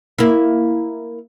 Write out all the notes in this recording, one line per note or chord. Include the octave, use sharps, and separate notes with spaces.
A#3 E4